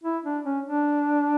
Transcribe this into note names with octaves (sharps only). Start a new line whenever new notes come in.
E4
D4
C#4
D4